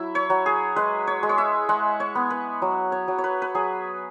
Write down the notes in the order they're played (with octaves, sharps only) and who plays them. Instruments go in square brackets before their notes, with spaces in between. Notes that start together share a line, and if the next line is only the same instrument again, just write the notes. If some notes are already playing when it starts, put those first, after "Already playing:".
Already playing: [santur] F#3 E4 E5
C#5
F#3
G#4
G#3 B4
C#5
G#3
C#5
E5
G#3 F#5
C#5
B3
B4
F#3
C#5
F#3
C#5
B4
B4
F#3 G#4